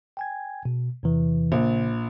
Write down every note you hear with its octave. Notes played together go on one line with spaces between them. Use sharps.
G5 G#5 G#6
B2
E2 C3 E3
A#1 C#3